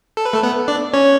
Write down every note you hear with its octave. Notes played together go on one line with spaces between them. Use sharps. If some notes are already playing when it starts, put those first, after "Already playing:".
A4
B4
A3 A4
B3 B4
D4 D5
C#4 C#5